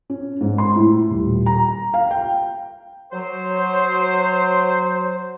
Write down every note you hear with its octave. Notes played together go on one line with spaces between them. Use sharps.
C#4
G#2
C6
A2
D#1
A#5
F5
G5
F#3 C5